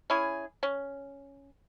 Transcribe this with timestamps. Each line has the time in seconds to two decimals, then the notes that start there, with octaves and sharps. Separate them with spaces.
0.10 C#4 E4 G#4
0.63 C#4